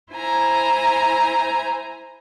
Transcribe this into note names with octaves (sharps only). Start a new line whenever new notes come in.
E4 C5 G#5 A#5